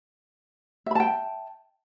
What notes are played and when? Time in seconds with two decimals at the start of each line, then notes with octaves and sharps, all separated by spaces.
0.86 E5
0.91 B5
0.95 A5
1.00 G5